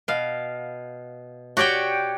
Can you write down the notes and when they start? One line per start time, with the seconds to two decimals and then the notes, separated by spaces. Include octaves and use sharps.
0.08 B2 F5
1.57 F#4 G4 C#5 D5 G5